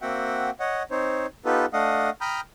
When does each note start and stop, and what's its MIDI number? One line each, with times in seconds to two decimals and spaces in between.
0.02 0.50 58
0.02 0.50 60
0.02 0.50 66
0.02 0.50 76
0.02 0.50 78
0.02 0.50 79
0.60 0.83 73
0.60 0.83 75
0.60 0.83 78
0.91 1.26 60
0.91 1.26 63
0.91 1.26 72
0.91 1.26 73
1.45 1.65 59
1.45 1.65 63
1.45 1.65 65
1.45 1.65 67
1.45 1.65 69
1.45 1.65 71
1.73 2.10 57
1.73 2.10 62
1.73 2.10 75
1.73 2.10 77
1.73 2.10 78
1.73 2.10 87
2.21 2.40 79
2.21 2.40 82
2.21 2.40 83
2.21 2.40 87
2.21 2.40 89
2.21 2.40 91